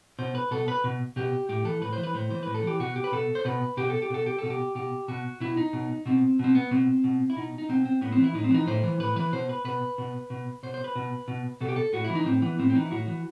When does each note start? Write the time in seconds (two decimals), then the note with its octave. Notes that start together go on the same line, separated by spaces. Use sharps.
0.19 B2 C5
0.35 B4
0.51 B2 A4
0.68 B4
0.84 B2
1.16 B2 G4
1.49 A2 G4
1.65 E3 A4
1.81 A2 B4
1.93 C5
1.98 E3
2.04 B4
2.14 A2 C5
2.30 E3 C5
2.43 A2 B4
2.54 A4
2.63 E3 G4
2.80 B2 F#4
2.96 G4
3.04 B4
3.12 B2 A4
3.35 C5
3.45 B2 B4
3.77 B2 G4
3.90 A4
4.02 G4
4.10 B2 A4
4.26 G4
4.38 B2 A4
4.50 G4
4.75 B2 G4
5.08 B2 F#4
5.40 B2 E4
5.57 D#4
5.73 B2
6.06 B2 C4
6.39 B2 C4
6.55 B3
6.71 B2 C4
7.04 B2
7.30 E4
7.36 B2 D#4
7.58 D#4
7.69 B2 C4
7.86 C4
8.01 A2 B3
8.12 C4
8.18 E3
8.24 E4
8.34 A2 D#4
8.44 C4
8.51 E3 D#4
8.67 A2 C5
8.84 E3
9.00 A2 B4
9.16 E3 B4
9.32 B2 C5
9.49 B4
9.65 B2 B4
9.98 B2
10.30 B2
10.63 B2 C5
10.74 C5
10.84 B4
10.95 B2
11.28 B2
11.61 B2 A4
11.69 G4
11.76 A4
11.93 A2 F#4
12.05 E4
12.10 E3
12.15 D#4
12.26 A2 C4
12.42 E3 B3
12.59 A2 C4
12.70 C4
12.75 E3 D#4
12.85 E4
12.91 A2 F#4
13.08 E3